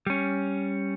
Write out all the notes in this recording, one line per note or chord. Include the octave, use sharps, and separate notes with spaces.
G3 C#4